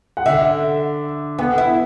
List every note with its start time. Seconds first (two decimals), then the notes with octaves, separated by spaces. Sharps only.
0.17 F#5
0.26 D3 E5
1.39 B3 F#5
1.58 E4 E5